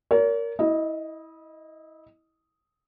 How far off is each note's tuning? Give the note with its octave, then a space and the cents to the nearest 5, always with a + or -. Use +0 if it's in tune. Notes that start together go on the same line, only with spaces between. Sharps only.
A#4 +0 C#5 +45
E4 -25 D#5 +0